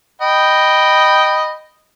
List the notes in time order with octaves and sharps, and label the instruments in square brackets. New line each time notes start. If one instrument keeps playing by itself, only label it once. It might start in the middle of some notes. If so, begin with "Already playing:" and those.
[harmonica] D#5 G5 B5